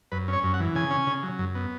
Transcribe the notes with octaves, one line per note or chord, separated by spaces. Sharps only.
F#2 B4
C#4 C#5
F#2
F#5
E3
C#3 G#5
C#4
C#3
F#3
F#2
B3